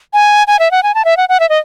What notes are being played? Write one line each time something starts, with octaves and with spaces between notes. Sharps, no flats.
G#5
G#5
E5
F#5
G#5
A5
E5
F#5
F#5
E5
D#5